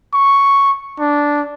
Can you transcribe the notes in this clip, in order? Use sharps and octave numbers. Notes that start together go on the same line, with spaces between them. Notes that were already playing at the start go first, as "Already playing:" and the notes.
C#6
D4